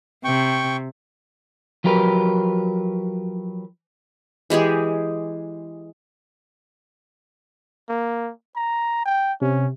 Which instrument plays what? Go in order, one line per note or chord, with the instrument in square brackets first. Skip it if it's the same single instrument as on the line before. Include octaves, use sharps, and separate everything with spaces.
[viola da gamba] C3 [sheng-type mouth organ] G5 C#6
[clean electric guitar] F3 F#3 G4 A#4 B4
[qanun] E3 G#3 G4 G#4
[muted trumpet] A#3
A#5
G5
[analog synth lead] C3 [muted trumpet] C#4